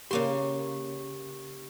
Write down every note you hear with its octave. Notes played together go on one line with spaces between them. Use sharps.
C#3 A#3 G4 C6